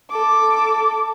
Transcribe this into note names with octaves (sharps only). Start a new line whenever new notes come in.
A4 D6